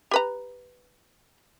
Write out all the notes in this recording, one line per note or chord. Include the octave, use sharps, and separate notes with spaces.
G4 B4 A#5